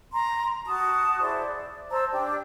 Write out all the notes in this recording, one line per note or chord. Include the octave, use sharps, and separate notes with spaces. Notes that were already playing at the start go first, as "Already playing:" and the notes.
A#5 C6
F#4 A5 D#6
E4 G#4 C5 D5
D5
C5 A5 A#5 E6
D4 G4 D5